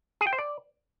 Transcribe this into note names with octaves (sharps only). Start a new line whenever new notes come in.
G#4
G5
C5
D5